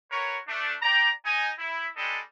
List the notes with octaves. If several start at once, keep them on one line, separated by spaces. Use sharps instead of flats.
F#4 A#4 B4 C#5
A3 D4
D5 G5 A#5
D#4 G#5
E4
G3 G#3 D4 G4 A4 D#5